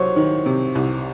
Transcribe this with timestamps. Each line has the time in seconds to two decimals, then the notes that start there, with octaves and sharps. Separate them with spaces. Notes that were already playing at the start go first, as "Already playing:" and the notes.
Already playing: C2 F#3 C5 C#5
0.16 D#3
0.46 C3
0.75 C2